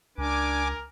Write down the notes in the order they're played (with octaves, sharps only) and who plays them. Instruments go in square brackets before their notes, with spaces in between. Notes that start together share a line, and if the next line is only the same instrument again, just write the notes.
[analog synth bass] C#2 [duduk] D4 [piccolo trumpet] A#4 [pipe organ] G#5 D6